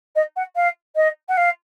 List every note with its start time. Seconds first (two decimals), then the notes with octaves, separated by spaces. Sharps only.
0.15 D#5
0.36 F#5
0.55 F5
0.95 D#5
1.28 F#5
1.37 F5